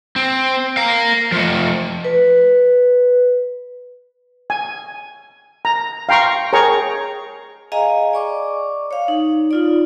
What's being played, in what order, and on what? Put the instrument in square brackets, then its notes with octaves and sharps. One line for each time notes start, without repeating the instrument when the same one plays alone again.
[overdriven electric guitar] C4
A#4 F5
F3 A3
[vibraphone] B4
[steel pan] G#5
A#5
F5 G5 A#5 C6 C#6
G#4 A#4 C#5 G5 A#5 C#6
[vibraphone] G#4 D#5 F5 G#5 A#5
D5 C#6 D6
C#5 F5
D#4
D#4 F4 D5